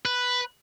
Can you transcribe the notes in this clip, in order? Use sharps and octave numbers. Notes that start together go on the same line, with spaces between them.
B4